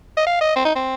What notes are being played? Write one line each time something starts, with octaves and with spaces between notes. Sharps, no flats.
D#5
F5
D#5
C4
D#4
C4